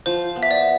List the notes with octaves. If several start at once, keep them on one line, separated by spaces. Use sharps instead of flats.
F3 C5
B3
E5
D5